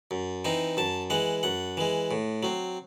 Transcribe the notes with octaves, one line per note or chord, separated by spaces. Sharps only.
F#2
E3 C4 D#4
F#2 A5
E3 G#3 F#5
F#2 F#5
E3 G#3
A2
F#3 C4